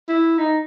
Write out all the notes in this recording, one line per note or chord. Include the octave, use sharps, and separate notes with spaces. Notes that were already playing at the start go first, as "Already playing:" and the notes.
E4
D#4